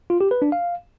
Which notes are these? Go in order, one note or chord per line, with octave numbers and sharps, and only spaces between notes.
F4
G4
B4
D4
F5